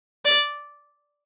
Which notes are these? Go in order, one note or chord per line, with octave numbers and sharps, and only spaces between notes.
D5